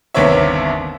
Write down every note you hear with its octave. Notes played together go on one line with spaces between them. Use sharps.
G1 D#2 C3 B3 C#5 E5